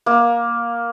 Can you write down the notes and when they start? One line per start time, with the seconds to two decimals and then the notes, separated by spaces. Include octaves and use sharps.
0.06 A#3